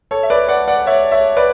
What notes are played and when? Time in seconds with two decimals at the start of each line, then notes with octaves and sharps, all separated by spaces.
0.11 A4 C#5
0.23 E5
0.30 B4 D5
0.49 D5 F#5
0.68 D5 F#5
0.87 C#5 E5
1.12 C#5 E5
1.37 B4 D5